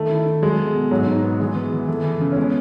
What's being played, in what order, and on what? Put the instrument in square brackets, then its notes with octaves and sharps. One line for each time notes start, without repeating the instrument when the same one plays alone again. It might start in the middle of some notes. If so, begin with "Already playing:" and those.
Already playing: [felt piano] D#3 [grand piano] A3
[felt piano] E4
E4
[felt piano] F#3 [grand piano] G#3
[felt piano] B3
B2
[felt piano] G#2 [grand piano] F#3
[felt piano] D#4
B3
[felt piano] E3 [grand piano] G#3
[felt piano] B3
E3
[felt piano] E3 [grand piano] A3
[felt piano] E3
C#3
[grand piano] C#4
[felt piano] G#3 [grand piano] B3